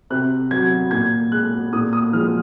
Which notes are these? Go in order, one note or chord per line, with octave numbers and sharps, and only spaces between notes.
C3 F#6
F#3 G#6
A#2 G#6
G#3 F#6
A#2 D#6
D#6
F3 G#3 F6